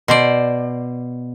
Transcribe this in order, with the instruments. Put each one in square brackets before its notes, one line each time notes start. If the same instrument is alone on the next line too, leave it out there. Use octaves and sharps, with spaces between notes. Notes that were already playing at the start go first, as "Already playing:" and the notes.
[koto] B2 C5 D5